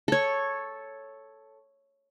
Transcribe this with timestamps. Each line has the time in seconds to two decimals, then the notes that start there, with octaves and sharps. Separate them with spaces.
0.08 A4 C#5